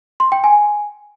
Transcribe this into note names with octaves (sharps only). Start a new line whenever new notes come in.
C6
G5
G#5